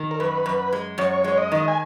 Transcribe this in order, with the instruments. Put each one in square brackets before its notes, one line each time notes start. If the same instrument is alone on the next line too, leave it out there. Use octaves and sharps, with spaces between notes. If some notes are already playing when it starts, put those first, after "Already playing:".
Already playing: [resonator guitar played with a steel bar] D#3
[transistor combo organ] A#4
[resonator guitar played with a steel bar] F#2 [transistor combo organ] B4
[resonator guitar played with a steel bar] F#2
G#3
[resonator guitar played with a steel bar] F#2 [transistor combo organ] C#5
[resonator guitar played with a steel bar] G#3 [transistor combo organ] C#5
[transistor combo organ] D#5
[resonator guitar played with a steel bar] D#3
[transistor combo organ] G#5